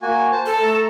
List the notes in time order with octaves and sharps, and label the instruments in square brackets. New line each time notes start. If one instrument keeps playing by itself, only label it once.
[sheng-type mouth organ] A#3 F#4 G#5
C5 A5
[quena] A4 [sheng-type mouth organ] F6
[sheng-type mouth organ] A3 A#5